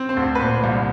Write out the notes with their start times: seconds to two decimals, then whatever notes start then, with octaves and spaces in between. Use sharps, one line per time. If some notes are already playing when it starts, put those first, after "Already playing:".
Already playing: C4
0.09 C5
0.17 D2
0.35 B4
0.40 A#2 C5
0.64 C2